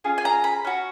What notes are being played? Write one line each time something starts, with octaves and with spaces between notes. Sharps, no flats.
C#4 F4 G#4
G#5
A#5
B5
C#4 F#4